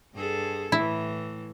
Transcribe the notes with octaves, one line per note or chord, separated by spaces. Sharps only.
G2 G#4 A4
A2 E3 E4